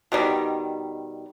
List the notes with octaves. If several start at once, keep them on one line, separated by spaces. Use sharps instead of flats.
B2 D#3 G3